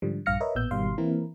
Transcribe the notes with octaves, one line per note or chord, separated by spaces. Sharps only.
G#2 D3 F3 G3
A#1 G2 F5 F6 A#6 C#7
A#4 B4 C#5 D#5 E5
A1 A#2 B3 E6 G6
G#1 B2 D#3 G3 F5 C6
E3 A#3 C4 E4 A#4